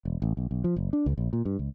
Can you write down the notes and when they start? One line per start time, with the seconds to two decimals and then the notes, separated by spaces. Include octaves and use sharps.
0.05 E1
0.22 A1
0.37 B1
0.51 B1
0.64 F3
0.76 F#1
0.93 D4
1.06 C#2
1.18 A#1
1.33 A#2
1.45 G2
1.59 C#2